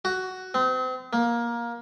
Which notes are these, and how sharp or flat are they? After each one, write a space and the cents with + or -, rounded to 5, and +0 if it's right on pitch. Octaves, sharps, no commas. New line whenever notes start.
F#4 +10
C4 -35
A#3 +15